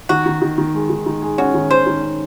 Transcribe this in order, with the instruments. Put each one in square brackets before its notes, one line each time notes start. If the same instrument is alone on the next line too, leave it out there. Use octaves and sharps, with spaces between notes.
[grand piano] D#3 [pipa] F#4
[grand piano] D#3
D#3
D#3
G#3
D#3
D#3
G#3
[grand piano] C#4 [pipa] F#4
[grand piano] D#3
[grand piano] D#3 [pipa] C5
[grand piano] D#3
C#4